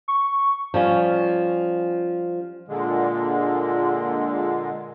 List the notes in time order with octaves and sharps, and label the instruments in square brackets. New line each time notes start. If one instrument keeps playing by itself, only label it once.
[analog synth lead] C#6
[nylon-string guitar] F3 G3 C#4
[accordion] A#2 D3 G#3